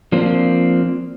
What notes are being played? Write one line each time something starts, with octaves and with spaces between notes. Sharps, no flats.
F3 A#3 C4 D4